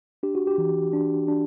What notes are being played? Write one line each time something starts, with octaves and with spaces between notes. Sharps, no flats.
D4 G4
F#4
G4
E3
D4
D4